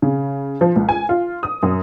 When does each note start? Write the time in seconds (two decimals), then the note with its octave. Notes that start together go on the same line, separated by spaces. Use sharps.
0.02 C#3
0.61 F3
0.76 C#2
0.89 G#5
1.09 F4
1.43 D#6
1.63 F#2